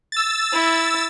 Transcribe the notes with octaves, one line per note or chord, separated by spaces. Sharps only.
E6 A6
E4